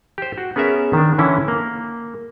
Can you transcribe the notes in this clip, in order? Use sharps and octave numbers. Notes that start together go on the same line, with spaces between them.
G4 C5
F#4
B3 C#4 G#4 A#4 E5
D#3 D4
D3 E3 C#4 E4
A#3